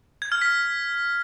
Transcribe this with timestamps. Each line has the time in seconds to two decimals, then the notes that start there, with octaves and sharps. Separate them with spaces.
0.22 G#6
0.32 F6
0.42 B6